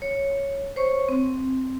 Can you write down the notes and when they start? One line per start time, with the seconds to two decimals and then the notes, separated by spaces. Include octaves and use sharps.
0.02 C#5
0.76 C5 C#5 C#6
1.09 C4